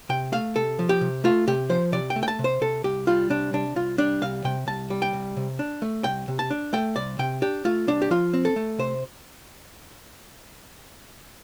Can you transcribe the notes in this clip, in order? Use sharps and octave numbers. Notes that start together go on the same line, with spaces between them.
C3 G5
A3 F5
C3 A4
F3
G4
C3
A3 F4
C3 G4
F3 C5
C3 D5
G5
A3
G5
A5
C3
C5
C3 A4
C2 G4
G3 F4
C2 D4
C3 D4
C2 F4
G3 D4
C2 F5
C3 G5
C2 A5
G3
G5
C2
C3
D4
A3
C2 G5
C3
A5
D4
A3 G5
C2 D5
C3 G5
D4 G4
A3 F4
C2 D4
G4
F3 F4
C4
A4
A3
C3 C5